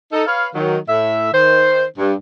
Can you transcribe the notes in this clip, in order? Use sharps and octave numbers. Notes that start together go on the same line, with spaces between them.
D#4 A4
B4 C#5 F5
D#3 F#3
A2 E5
D#3 C5
G2